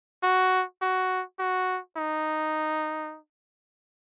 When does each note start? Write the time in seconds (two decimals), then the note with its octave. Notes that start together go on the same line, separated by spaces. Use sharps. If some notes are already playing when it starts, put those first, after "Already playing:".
0.23 F#4
0.82 F#4
1.39 F#4
1.97 D#4